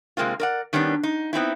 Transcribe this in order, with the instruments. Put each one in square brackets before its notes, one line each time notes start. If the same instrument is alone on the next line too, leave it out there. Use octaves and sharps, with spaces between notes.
[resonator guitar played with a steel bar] C3 G#3 A#3 C4 F4
A#4 D5 F#5
D#3 G3 B3 C#4 D4
D#4
B3 C4 D#4 E4